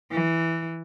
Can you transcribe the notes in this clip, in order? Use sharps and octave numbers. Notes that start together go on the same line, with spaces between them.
E3